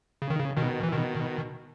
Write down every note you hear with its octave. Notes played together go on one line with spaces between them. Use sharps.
C#3
D#3
C#3
B2 D#3
E3
B2 D#3